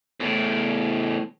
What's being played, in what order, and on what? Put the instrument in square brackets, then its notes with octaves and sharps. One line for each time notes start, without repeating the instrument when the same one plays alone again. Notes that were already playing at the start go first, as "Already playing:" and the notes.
[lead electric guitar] E2 A2